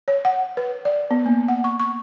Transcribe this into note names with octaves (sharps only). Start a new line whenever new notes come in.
C#5
F#5
B4
D5
B3
A#3
F#5
C#6
C#6